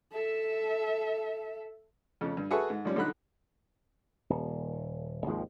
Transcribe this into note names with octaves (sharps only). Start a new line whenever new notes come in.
A4 E5
F2 C#3
G2
F#4 G#4 A4 B4 E5 C#6
G#2
A#1 G3 C#4
B1 D3 D#4 B5 F#6
D#1
G#1 D#2 F3 G#3